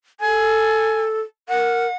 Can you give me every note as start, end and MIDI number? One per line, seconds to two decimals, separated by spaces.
0.20 1.21 69
0.20 1.00 80
1.49 1.86 70
1.49 1.97 78